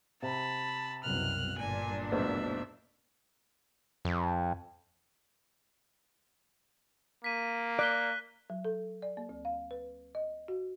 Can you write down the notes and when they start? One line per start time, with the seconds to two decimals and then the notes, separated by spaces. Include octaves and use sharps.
0.22 C3 A5 B5
1.04 C2 F#2 B2 F6 F#6
1.58 G1 G2 A#2 D4 G#5
2.11 F#1 D2 B2 E5
4.05 F2
7.24 A#3 B6 D#7
7.79 D5 F#6 B6 G7
8.50 F#3
8.65 A4
9.02 D5
9.17 A#3
9.29 D2
9.45 F5
9.71 B4
10.15 D#5
10.48 F#4